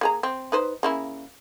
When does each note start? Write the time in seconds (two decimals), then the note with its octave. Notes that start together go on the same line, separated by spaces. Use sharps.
0.01 A#3 G#4 A#5
0.23 C4
0.52 D#4 B4 C5
0.83 C#3 A#3 E4